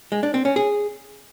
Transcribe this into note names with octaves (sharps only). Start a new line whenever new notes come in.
G#3
D4
C4
C#4
G#4